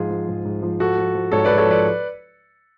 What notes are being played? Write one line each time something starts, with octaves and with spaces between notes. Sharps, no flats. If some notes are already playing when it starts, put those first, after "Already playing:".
Already playing: G#2 F3 F4 G#4
F3
G#2
G#2
F3
G#2 F#4 A4
F3
F3
G#2 A4 C#5
B4 D5
G#2
A4 C#5
F3 B4 D5